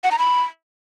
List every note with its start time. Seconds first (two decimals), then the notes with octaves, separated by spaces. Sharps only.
0.04 F#5
0.11 A#5
0.19 B5